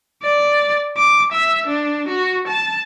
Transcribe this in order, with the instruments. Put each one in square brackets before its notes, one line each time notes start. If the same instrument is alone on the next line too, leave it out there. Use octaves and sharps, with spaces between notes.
[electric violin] D5
D6
E5
D4
F#4
A5